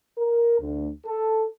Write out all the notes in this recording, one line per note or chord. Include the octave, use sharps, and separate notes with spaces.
A#4
D2
A4